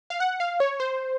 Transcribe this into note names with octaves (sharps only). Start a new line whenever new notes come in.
F5
F#5
F5
C#5
C5